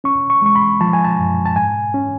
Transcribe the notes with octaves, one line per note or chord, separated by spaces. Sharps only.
C#4 C#6
C#6
G#3 C#6
B5
F3 A5
G#5
A5
F#2
A5
G#2 G#5
C#4